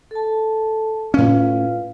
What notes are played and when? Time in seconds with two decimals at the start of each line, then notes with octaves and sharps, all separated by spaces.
0.11 A4 A5
1.14 A2 C#4 F4 B4 F5